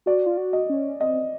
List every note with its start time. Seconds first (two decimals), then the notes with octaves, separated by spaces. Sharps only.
0.06 F#4 D5
0.26 F4
0.37 F#4
0.53 D#5
0.70 C#4
1.01 C4 D#5